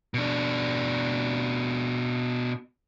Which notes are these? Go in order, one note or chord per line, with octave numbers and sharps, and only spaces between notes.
B2 D4